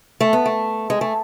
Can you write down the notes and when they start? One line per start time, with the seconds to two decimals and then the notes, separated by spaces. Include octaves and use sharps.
0.21 A3
0.33 B3
0.46 A3
0.90 G#3
1.01 A3